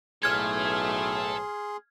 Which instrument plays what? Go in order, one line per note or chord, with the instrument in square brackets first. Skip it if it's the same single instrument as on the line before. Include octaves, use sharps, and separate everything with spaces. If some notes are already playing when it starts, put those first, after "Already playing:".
[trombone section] B1 A2 [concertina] G#4 C6 [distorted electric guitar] A4 E5 [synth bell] F6 G#6